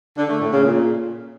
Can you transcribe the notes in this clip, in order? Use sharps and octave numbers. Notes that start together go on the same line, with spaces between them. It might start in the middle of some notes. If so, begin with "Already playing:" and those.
D3
A3
A2
C#3
A#2